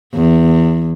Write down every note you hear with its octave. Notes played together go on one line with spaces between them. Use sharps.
E2